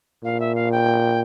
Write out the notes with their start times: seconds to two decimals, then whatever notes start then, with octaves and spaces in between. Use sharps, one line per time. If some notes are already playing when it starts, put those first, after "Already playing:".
0.24 A#2 F5
0.40 E5
0.55 F5
0.71 G5